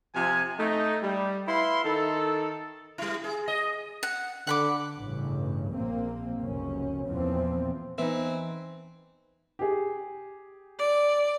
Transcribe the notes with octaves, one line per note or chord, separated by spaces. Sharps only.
C3 F3 G#5
A3 D#4
G3
E4 B4 F5 C6
D#3 D#4 A4
G3 E4
G#4
D#5
F#5
D3 F#5 B5 D6
A1 G2 C#3
A#1 A#3 C4
F1 C#2 F#2 C#4
E2 A#2 E3 F3 C4
E3 B3 C4 D#4 B4 E5
G4 G#4
D5